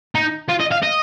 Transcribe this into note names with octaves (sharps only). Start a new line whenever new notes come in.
D#4
F4
D#5
F5
D#5